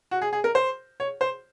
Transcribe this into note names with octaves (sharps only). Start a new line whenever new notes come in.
F#4
G#4
G#4
A#4
C5
C#5
C5